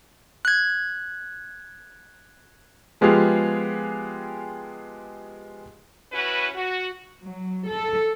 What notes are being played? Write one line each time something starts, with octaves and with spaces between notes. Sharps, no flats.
F#6 G#6
F3 G#3 B3 F4 G4 G#4
C#4 E4 F#4 B4
F#4
F#3
A4